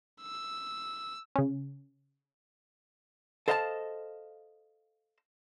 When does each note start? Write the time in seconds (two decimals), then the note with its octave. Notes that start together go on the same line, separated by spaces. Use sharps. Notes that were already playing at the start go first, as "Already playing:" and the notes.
0.22 E6
1.36 C#3 C#4
3.48 A4 C5 D#5 F5 F#5 A5